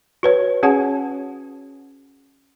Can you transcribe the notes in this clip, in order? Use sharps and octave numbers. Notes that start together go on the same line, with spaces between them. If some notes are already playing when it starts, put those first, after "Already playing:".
F#4 B4 C#5
C#4 F#4 G#4 C#5 F#5 A5